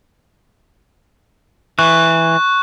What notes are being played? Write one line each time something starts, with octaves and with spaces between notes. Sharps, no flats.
E3 C#6 F#6